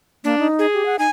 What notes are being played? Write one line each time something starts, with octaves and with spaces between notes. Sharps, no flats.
A#3 D4
D#4
G#4
G4
F#5
D#4 G#5